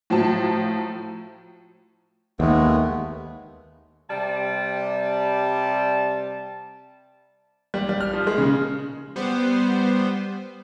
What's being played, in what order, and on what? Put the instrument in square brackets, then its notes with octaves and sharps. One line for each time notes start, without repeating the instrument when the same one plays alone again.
[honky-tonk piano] A2 F3 F#3 A5
[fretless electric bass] D#2 [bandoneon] G#3 A3 B3
[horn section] C3 G3 A5
[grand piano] G3
G3
F6
F3
G#3
C#3
[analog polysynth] G3 B3 C5